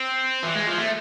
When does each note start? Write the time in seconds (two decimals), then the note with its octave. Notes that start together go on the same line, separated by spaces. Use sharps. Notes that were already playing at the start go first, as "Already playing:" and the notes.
Already playing: C4
0.43 E3
0.55 G#3
0.67 F3
0.78 A3